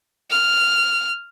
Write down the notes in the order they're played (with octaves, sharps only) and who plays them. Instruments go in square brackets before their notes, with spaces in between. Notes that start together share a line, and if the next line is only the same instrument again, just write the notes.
[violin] F6